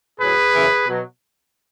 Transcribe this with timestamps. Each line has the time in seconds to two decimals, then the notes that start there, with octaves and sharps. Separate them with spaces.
0.20 A2 F#3 G#4 B4
0.54 F#2 C#3 E3
0.88 B2 F#3